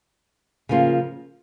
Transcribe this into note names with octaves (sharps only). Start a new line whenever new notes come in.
C#3 F3 A#3 F4